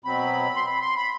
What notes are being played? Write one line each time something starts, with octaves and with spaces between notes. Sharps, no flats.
B2 F#3 C4 B5
C6
B5
C6
B5